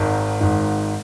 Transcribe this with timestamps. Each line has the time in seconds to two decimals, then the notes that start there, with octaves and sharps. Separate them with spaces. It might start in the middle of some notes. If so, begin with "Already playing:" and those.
Already playing: G#1 G#2 D#3
0.40 G#1 G#2 D#3